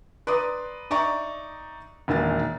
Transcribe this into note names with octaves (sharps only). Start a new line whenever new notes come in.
B4 D5 A#5 C6 D6 D#6
D#4 D5 E5 A#5 C#6
E1 A#2 D#3 G#5 A6